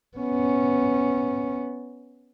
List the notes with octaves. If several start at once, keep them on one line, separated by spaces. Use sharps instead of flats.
B3 C#4